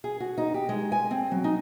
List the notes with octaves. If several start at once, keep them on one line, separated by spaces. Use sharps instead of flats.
G#4
F#4
D#4
G4
G#3
G#5
C4
F#3
D#4